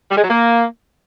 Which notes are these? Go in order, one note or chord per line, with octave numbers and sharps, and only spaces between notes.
G3
G#3
F#3
A#3